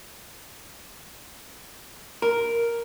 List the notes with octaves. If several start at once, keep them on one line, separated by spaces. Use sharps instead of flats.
A#4